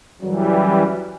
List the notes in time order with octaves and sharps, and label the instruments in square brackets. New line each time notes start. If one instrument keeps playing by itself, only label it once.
[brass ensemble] F#2 C#3 F#3 [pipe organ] E3 G3